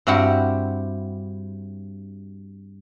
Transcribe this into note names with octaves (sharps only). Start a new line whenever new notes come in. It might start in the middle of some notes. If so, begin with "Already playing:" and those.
G2 C4 E4 F#4 G4 F#5